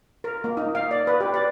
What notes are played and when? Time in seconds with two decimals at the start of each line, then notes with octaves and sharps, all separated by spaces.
0.24 A#4
0.44 A#3
0.57 D#4
0.75 F5
0.91 D5
1.07 B4
1.20 G4
1.34 D5